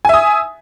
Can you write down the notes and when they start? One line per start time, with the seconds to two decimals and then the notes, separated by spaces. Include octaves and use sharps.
0.05 G#5
0.09 E5
0.14 D#6